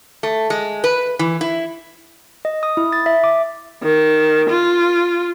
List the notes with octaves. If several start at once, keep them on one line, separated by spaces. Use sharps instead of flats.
A3
G#3
B4
E3
E4
D#5
D#6
E4
A6
E5
D6
D#3
F4